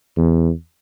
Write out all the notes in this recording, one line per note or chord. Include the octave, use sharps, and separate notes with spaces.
E2